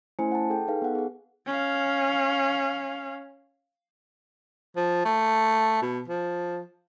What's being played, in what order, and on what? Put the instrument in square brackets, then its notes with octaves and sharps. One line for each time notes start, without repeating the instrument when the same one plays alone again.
[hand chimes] A3 C#4 E4 C5 G#5 C#7
F#5 A5
G#4 A4 G5
D#4 G#4 A4 B4 F5
B3 F#5
G#4 F#5
[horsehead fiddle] C#4 F5
[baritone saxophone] F3
A3
B2
F3